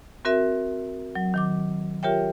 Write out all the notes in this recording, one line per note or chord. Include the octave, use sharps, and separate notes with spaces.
C4 F#4 A#4 E5
F#3
D#3 F#3 D6
F4 G4 A#4 C#5 E5 G5